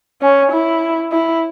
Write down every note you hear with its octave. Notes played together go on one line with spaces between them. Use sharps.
C#4
E4
E4